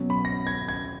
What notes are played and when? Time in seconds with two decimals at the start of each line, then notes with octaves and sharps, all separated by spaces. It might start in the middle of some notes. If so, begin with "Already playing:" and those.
Already playing: B2 F#3 C#4
0.10 B5
0.25 A#6
0.47 G#6
0.68 G#6